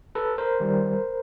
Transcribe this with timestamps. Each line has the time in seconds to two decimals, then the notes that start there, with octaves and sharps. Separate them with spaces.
0.15 A4 B4
0.38 A#4 C5
0.60 D#3 G3